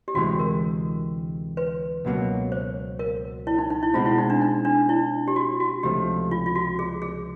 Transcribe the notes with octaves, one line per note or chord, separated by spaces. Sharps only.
G4
D2 C3 E3 G#3 F#4
A#4
B4
C#2 B2 F#3 A#3
C5
A#4
E4
D#4
D#4
E4
B2 G#3 C4 F4
E4
D#4
D4
D#4
D4
E4
G4
F#4
F#4
C#2 C3 F3 A3 G4
F4
F4
F#4
G#4
G#4